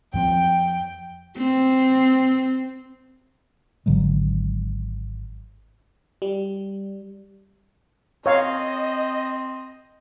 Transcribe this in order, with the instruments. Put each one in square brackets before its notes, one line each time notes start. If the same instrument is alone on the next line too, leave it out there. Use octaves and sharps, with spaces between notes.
[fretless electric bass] F2 F3 C4 [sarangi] G5
[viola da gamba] C4
[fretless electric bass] G#1 D3 F#3 G#3
[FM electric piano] G3
[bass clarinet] C4 [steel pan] C#5 F5 [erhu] D#5